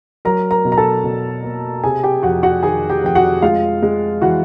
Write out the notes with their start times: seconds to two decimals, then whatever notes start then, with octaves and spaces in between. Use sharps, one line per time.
0.25 F#3 A#4 A#5
0.51 A#4 A#5
0.65 B2
0.72 A#5
0.78 A4 A5
1.04 B2
1.44 A#3
1.83 C3 G#4 G#5
2.03 G4 G5
2.23 F2 F#4 F#5
2.43 F#4 F#5
2.63 D#3 G#4 G#5
2.90 G4 G5
3.03 F2 G5
3.15 F#4 F#5
3.42 G#3 F4 F5
3.83 G#3
4.21 E3 F#4 F#5